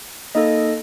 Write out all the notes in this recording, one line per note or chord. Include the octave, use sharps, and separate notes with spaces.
A#3 D#4 A4 D#5